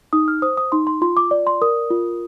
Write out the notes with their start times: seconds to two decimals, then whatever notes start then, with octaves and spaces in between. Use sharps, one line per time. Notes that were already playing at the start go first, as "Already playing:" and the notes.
0.13 D#4 D#6
0.28 F6
0.42 C5 D#6
0.57 D#6
0.72 D#4 C6
0.87 C6
1.02 F4 C6
1.17 D6
1.31 D5
1.47 C6
1.61 A#4 D#6
1.90 F4